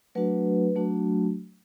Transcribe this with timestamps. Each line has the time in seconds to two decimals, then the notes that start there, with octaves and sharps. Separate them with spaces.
0.15 F#3 A3 D4 F#4 B4
0.75 F#3 A3 D4 F#4